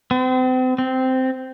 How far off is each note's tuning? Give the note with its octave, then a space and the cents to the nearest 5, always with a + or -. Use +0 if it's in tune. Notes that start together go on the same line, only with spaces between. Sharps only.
C4 -35
C4 -10